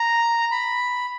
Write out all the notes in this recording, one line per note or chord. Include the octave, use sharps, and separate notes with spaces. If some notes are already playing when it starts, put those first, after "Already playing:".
Already playing: A#5
B5